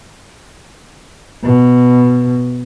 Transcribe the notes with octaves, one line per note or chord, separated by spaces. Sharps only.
B2